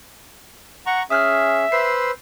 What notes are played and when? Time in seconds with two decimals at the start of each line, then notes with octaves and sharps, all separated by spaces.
0.86 F#5 A#5 C#6
1.10 C#4 G#4 E5 D#6 F6 F#6
1.72 B4 C5 E6 C7